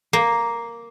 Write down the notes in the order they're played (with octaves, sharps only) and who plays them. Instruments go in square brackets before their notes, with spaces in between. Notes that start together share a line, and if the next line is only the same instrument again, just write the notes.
[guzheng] A#3